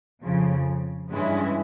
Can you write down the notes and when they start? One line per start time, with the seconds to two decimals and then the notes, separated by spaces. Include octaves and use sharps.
0.22 F2 C#3 F3
1.10 G2 E3 G#3 C#4 E4